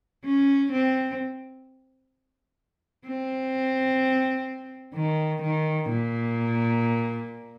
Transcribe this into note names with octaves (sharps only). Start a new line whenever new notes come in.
C#4
C4
C4
D#3
D#3
A#2